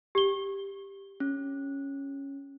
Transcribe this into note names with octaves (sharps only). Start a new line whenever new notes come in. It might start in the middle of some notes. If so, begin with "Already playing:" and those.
G4 G7
C#4